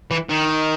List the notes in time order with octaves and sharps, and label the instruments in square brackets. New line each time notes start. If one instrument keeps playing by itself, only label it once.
[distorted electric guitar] E3
D#3